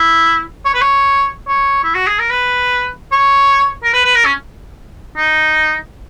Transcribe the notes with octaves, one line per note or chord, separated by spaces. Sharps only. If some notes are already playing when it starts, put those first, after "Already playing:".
Already playing: E4
C#5
B4
C#5
C#5
E4
F#4
G#4
A#4
B4
C#5
A#4
B4
B4
A#4
C#4
D#4